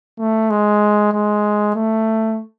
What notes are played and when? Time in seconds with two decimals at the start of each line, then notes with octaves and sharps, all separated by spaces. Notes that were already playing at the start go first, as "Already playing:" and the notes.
0.19 A3
0.50 G#3
1.13 G#3
1.75 A3